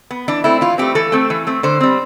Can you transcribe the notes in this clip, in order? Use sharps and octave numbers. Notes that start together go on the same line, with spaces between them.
B3
E3 D4
A3 C4 E4
E3 F4
A3 C4 G4
E3 A4
A3 C4
E3
A3 C4
D3 C5
G3 C4